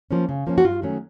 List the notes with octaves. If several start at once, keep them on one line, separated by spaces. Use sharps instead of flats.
F3 A#3 C#4
C#3
F3 A#3 C#4
F#4
G2 F4
D#3 F#3 A3 C#4